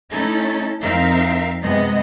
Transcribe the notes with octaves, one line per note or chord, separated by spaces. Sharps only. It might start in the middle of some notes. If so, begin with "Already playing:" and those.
A3 C#4 D#4 E4 A4
F2 C4 D#4 A#4 E5 F5
F#2 C3 G#3 B3 D#5